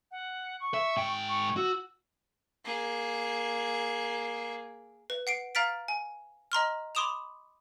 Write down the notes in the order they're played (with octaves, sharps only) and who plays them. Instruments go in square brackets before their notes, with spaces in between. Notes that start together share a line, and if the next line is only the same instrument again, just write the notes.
[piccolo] F#5
C#6
[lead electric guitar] E5
G#2 G5
[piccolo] C#6
[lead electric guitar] F#4 [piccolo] E6
[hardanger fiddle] A#3 G#4
[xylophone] B4
F#5 C7 D7
F5 A#5 F6 A6 B6 D7
G#5
D#5 A#5 C6 F6
B5 C6 D6 D#6 E7 F7